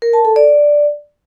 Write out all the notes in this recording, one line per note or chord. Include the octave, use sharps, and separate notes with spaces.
A#4
A5
A4
D5